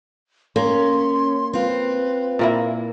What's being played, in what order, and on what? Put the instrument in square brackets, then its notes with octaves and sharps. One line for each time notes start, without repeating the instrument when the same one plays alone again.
[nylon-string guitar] A#3 [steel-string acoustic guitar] C#4 [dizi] C6
[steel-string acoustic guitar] C4 F4 [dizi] B4
[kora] A#2 A#3 E4